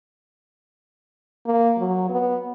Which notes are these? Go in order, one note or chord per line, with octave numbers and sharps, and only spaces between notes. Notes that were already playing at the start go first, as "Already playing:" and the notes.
A#3
F#3
B3